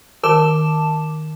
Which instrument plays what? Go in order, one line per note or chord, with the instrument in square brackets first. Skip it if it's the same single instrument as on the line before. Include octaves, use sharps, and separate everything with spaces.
[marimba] D#3 [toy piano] A#4 [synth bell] A5 D6 E7